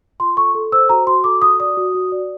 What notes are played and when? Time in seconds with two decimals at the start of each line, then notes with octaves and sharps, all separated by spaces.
0.20 F4 C6
0.37 A4 C#6
0.55 A4
0.72 C5 E6
0.89 F#4 A#5
1.07 F#4 C6
1.24 A4 D6
1.42 F#4 D#6
1.60 D5 D#6
1.77 F#4
1.95 F#4
2.12 D5